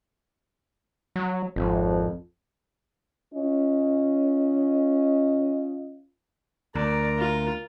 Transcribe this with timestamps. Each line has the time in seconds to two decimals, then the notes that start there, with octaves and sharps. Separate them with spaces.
1.16 F#3
1.56 G#1 F2
3.34 C#4 F4 D#5
6.75 D2 A#4 D5 A#5
7.18 F4